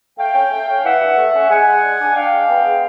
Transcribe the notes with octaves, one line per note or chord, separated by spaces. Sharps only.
A3 F5 G5
C#4
A3
C#4
E3 E5 F#5
G2
A3
C#4
G#3 F#5 G#5
G#3
D4
D4
D4 F5 G5
G#3
B3
G#3